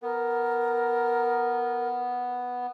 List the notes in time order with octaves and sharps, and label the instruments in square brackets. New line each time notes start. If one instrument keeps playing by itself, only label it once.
[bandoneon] B3 [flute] A#4